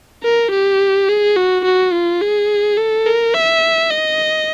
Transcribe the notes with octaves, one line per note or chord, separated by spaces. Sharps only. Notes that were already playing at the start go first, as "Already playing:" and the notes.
A#4
G4
G#4
F#4
F#4
F4
G#4
A4
A#4
E5
D#5